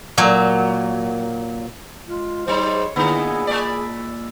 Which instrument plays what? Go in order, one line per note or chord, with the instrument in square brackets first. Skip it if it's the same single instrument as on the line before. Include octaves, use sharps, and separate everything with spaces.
[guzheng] A#2 F#3
[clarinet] G#3 [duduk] F4
[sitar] G#2 F#3 D#4 [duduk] C5 [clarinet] C#5
[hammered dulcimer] A#2 E4 [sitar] D3 [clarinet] B3 [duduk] G#4
[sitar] G#3 D5 [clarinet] B5